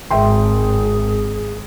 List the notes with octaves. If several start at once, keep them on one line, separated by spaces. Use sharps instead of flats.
G#1 G#4 E5 G5 C6